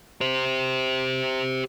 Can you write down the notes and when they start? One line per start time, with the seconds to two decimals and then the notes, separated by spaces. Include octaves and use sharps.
0.21 G4 C5